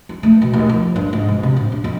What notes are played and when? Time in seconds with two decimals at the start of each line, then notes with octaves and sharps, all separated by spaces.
0.09 E4
0.23 A3
0.42 B2
0.53 D#2
0.69 F3
0.96 G2
1.13 G#2
1.28 B2
1.43 C3
1.57 A2
1.72 D4
1.84 F2